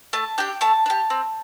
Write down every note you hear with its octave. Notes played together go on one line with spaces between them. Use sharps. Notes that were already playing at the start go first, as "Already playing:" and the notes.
A3 A5
D4 G4 G5
A3 A5
D4
G4
C4